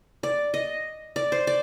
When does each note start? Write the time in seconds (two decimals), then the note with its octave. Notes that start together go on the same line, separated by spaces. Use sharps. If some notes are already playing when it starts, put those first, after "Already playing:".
0.23 D5
0.54 D#5
1.16 D5
1.32 C5
1.47 D5